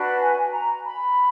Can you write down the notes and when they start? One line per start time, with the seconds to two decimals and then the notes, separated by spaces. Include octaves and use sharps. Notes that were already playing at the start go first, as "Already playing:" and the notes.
Already playing: D4 F#4 B4
0.19 G#5
0.51 A#5
0.85 B5